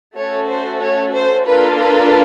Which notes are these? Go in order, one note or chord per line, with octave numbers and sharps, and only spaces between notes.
A3 C#4 F#4 A4 C#5
C5
C#5
C5
A#3 D4 F4 A4 B4
B4